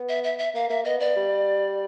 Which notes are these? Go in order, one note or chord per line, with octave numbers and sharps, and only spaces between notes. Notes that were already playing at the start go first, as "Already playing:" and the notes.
Already playing: B3
E5
E5
E5
A#3 F5
A#3 E5
B3 D#5
B3 D5
G3